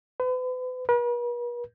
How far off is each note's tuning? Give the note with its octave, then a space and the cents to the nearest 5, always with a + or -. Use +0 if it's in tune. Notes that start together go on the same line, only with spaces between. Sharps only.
B4 +40
B4 -45